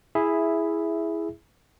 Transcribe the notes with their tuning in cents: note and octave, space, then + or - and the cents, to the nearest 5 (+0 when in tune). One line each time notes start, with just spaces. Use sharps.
E4 +0 G#4 +0 E5 +5